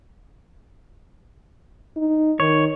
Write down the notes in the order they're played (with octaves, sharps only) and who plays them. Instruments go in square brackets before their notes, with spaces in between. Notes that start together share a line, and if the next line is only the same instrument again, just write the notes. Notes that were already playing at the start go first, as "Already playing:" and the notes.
[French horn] D#4
[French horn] D#3 [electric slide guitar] C#5